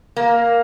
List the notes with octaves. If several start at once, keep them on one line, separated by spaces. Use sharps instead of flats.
A#3